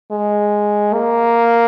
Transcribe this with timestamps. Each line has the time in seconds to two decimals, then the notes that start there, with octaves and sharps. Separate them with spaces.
0.11 G#3
0.94 A#3